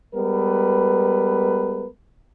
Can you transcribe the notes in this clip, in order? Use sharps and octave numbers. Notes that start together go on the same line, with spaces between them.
G3 G#3 B3 A#4 B4